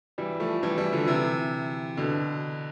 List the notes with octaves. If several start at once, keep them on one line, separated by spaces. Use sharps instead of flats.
E3 G3
F3 A3
E3 G3
E3 G3
D3 F3
C3 E3
B2 D3